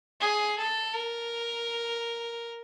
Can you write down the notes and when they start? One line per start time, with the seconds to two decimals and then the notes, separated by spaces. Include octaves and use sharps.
0.21 G#4
0.58 A4
0.95 A#4